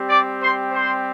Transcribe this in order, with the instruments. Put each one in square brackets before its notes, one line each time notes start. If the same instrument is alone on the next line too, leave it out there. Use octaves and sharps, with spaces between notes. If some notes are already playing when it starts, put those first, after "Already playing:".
Already playing: [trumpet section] G3 C4 G4
D5 D6
C5 C6
C5 C6